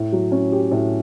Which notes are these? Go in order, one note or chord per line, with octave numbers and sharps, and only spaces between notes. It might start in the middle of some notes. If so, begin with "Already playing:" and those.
Already playing: A2
F#3
C#4
G4
A2